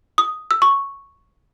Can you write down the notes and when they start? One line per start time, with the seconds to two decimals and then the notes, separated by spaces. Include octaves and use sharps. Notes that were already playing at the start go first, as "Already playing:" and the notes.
0.18 D#6
0.51 E6
0.62 C#6